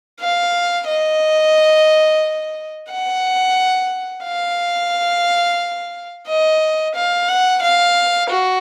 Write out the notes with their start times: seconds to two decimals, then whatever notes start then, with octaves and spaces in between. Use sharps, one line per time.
0.21 F5
0.87 D#5
2.90 F#5
4.25 F5
6.27 D#5
6.95 F5
7.28 F#5
7.62 F5
8.30 F#4